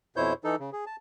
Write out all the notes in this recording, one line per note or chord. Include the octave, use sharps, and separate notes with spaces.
F2 B2 E4 C5 C#5 G6
E3 D#4 A4
C#3
G#4
A5